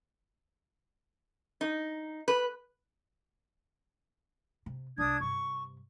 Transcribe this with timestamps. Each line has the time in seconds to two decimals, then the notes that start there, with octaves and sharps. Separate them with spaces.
1.61 D#4
2.28 B4
4.66 C3
4.98 C2 G#3 D4 D#6 G#6
5.20 G2 C3 C#6